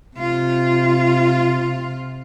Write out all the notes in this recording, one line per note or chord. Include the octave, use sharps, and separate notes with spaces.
C3 F4